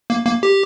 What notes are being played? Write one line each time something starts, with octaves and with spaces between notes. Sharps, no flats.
A#3
A#3
G4